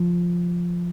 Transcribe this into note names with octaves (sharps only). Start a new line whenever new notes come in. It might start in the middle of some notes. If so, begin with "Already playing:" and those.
Already playing: F3